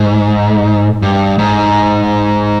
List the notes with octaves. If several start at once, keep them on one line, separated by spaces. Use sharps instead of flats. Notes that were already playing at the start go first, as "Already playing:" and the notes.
Already playing: G#2
G2
G#2